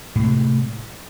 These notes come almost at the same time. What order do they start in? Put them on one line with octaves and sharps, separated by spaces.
A2 G#3 C3